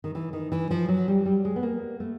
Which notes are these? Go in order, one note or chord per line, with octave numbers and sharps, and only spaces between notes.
D#3
E3
D#3
E3
F3
F#3
G3
G3
G#3
B3
A#3
A3